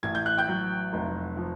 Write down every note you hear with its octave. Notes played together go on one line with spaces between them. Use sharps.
A1 G#6
G6
F#6
G5 G6
F#3
F1
F3